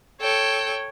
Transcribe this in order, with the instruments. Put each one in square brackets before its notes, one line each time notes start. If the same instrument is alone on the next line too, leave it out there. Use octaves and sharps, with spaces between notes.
[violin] A4 G5 [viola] C#5